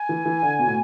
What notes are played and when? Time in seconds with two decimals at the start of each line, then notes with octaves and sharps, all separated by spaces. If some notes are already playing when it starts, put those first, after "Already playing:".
Already playing: G#5
0.09 E3
0.26 E3
0.42 D3
0.59 B2
0.67 A2